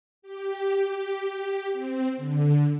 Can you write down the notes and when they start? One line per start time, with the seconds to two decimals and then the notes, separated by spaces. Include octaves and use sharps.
0.22 G4
1.73 C4
2.17 D3